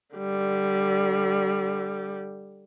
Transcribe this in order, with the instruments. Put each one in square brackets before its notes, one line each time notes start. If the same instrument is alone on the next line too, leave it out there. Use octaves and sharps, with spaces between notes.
[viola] D3 G3